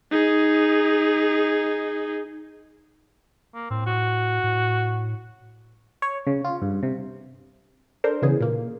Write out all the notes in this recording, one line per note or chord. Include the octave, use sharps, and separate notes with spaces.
D#4 G#4
A#3
A2 C4
F#4
A2
C#5
C#3
F4
G2
C3
D4 A4 A#4 C5
C#3 E3 B3 G#4
A#2 A#3